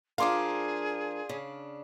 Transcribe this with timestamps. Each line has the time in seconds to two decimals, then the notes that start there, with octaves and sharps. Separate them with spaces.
0.18 F3 D4 G#4 A#4 F5 C6 D6
1.29 C#3 D4